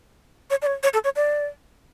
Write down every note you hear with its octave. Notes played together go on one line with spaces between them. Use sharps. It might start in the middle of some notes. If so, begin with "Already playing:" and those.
C#5
D5
C#5
C#5
A4
C#5
D5